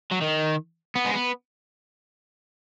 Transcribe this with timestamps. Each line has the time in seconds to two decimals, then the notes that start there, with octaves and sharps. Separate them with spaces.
0.11 F#3
0.21 D#3
0.95 B3
1.06 G#3
1.14 B3